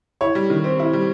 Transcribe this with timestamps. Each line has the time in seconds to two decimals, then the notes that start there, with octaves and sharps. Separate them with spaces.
0.21 E4 C#5
0.35 G3
0.50 D#3
0.64 C4
0.79 E4
0.93 G3